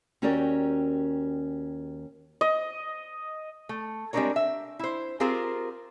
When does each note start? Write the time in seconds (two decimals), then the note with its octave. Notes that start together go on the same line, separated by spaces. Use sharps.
0.22 D#2 C#4 F#4 G4 A#4 D5
2.41 D#5
3.69 A3
4.13 G3 G#3 C4 D4 A#4 C#5
4.36 E5
4.79 E4 C5
5.20 C4 F4 G4 G#4 A#4 C5